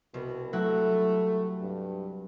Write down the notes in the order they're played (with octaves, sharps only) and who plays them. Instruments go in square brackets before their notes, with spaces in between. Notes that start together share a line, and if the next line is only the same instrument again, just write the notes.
[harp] C2 [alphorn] B2
[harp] F#3 E4 F#5 [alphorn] A3
[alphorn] G2